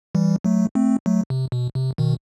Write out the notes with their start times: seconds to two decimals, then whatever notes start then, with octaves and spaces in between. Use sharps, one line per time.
0.15 E3 G3
0.44 F#3 A3
0.75 A3 C4
1.06 F#3 A3
1.30 C3
1.52 B2
1.75 C3
1.98 B2 D#3